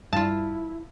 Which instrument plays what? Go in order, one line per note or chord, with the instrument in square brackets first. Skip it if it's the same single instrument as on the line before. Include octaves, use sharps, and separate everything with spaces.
[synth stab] G2 [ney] E4 [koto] F4 A5